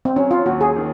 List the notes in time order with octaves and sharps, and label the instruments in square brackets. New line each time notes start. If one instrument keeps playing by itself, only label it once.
[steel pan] C4
[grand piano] F#3 [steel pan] C#4
[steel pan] F4
[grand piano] D#2 [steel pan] F#4
[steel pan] G#4
[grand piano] D#3